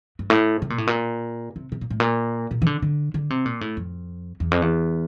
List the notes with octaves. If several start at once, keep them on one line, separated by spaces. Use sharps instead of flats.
G2
A2
C3
A#2
A2
A#2
C3
C3
A#2
A2
A#2
A#2
E3
D3
D3
D3
C3
A#2
A2
F2
E2
F2
E2